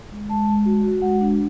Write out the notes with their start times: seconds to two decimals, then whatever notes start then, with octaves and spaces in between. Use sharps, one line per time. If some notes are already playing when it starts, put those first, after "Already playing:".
0.11 G#3
0.29 G#3 A5
0.48 G#3
0.66 F#4
0.84 F#4
1.02 G#3 F#5
1.21 D4